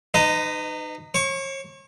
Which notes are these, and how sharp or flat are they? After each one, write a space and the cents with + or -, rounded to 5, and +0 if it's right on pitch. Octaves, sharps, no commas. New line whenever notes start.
D#4 -30 B4 +35 D#5 +0
C#5 -40 C#6 +25